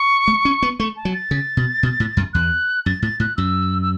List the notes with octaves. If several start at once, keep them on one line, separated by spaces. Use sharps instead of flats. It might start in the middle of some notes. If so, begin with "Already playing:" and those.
Already playing: C#6
A3
C#4
B3
A3 C#6
A5
F#3
A6
C#3
B2
B2
A2
F#2
E2 F#6
F#2 A6
A2 A6
A2 F#6
F#2 E6
E6